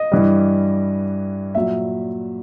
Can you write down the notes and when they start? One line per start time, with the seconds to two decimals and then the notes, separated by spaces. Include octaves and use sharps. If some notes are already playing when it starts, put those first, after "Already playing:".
Already playing: D#5
0.12 G2 E3 G3
1.55 A#2 F#3 E5